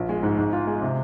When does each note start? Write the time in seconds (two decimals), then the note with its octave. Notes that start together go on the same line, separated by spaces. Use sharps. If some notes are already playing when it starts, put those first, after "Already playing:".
Already playing: A#1
0.09 G#3
0.23 G#2
0.39 G#2
0.53 F4
0.67 G#3
0.82 C3